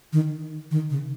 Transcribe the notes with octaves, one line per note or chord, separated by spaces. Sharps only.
D#3
D#3
C#3